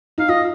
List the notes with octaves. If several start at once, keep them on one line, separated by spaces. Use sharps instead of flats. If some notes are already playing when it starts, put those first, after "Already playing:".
D#4 F5
F4 D#5